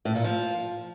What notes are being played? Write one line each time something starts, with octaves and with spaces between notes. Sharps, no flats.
A2
A#2
F3